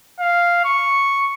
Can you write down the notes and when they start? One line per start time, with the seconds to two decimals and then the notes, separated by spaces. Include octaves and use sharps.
0.20 F5
0.65 C#6